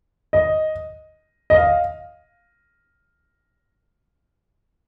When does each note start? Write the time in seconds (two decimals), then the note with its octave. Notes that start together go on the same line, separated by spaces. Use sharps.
0.33 D#5
1.50 D#5
1.55 F5